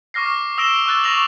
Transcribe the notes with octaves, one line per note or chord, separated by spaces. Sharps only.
C#6 D6 F6 A#6 C7
D#6 E6 A#6 D7 E7 G7
C#6 E6 F#6 A6
C#6 D6 A#6 F7 F#7